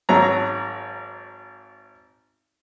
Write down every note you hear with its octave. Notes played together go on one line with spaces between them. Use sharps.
G#1 F#3 A#5